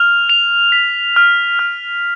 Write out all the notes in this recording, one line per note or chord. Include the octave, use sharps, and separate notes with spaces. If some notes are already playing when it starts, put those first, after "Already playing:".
Already playing: F6 F7
F7
B6
F6
F6